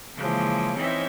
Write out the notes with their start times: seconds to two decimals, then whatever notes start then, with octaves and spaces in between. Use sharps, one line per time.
0.16 C#3 E3 F3 G#3 A#3
0.76 E3 C4 C#4 D#4 D#5 E5